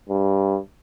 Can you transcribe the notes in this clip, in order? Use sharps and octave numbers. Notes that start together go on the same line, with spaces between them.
G2